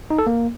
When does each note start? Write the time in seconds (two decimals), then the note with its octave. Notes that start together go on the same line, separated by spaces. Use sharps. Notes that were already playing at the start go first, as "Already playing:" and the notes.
0.10 D#4
0.19 A4
0.27 A#3